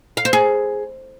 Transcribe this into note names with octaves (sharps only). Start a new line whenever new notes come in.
F5
C5
G#4